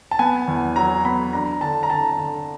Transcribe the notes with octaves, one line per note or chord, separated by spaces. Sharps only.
A5
B3 G#5
E2
F#3 A#5
B3 B5
D4 A#5
D3 A5
A#5
D3 A5
D3